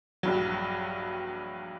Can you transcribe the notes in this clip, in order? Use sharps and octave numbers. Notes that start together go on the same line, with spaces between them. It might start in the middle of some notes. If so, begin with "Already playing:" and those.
A#1 G2 F#3